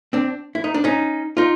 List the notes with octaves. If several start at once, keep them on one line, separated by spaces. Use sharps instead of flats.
C4 D4
E4
D#4
D4
C#4 D#4
D#4 F4